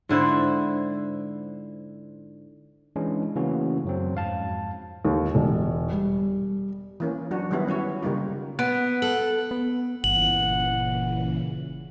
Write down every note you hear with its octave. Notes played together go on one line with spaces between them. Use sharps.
G#2 D3 E4 C5
E3 G#3 C#4 D4
C#3 E3 A3 A#3 C#4 F#4
F#2 F#3 C4
F2 G#2 F5 A5
D#2
E1
G3
E3 A#3 C#4
F#3 D4 F#4
D#3 F#3 G3 B3 E4
C#4 E4 F#4 C#5
C#3 G3 A#3 D#4 F4
B3 F#6 D7
A4 F#7
B3
G1 A#2 C#3 E3 F#5 F#7